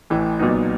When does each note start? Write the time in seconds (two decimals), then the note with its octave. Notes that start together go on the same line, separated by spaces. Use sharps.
0.10 A1 A2 E3
0.39 B1 A#2 F#3 B3 D#4